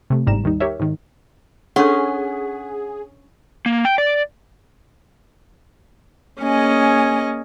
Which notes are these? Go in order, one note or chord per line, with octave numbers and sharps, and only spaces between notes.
C3 A3
G1 G#2 G3 A#5 E7
D#2 D#3 G3 D#4
G4 A#4 C#5 E5
G#2 D#3
C#4 D4 G#4 A4 F#5
A#3
G5
D5
A#3 C#4 G#4 D#5